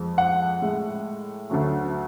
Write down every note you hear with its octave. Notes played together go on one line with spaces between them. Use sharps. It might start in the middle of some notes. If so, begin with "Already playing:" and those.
Already playing: F2 F3 G#3
F#5
A2 G#3
D2 D3 F#3 A3